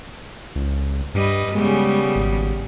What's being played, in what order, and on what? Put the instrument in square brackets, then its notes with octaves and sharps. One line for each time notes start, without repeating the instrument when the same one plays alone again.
[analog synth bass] C#2
[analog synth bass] G2 [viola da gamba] G3 B4 D#5
[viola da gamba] C#3 G3 B3 [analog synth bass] G#3
[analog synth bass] G#1